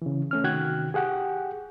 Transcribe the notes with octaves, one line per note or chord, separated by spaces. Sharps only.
C#3 E3
A3 C#4 F6
C3 D#3 F#4 G5 F#6 G#6
G4 G#4 F#5 G5